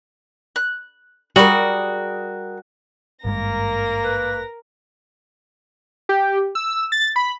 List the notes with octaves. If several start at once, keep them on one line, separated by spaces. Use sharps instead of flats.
F#6
G3 F#4 G#4 A#4
G#1 G2 G#3 A#3 A#4 A#6
B4
G4
E6
A6
B5